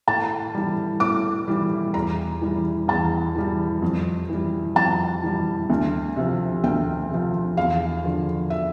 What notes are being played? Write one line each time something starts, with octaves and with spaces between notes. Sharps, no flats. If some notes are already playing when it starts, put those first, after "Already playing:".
A2 A5
E3 G3
A2 D6
E3 G3
E2 A#5
E3 G3
E2 A5
E3 G3
F2
E3 G3
F2 A5
E3 G3
D2
C3 F3
D2 G5
C3 F3
E2 F5
D3 F3
E5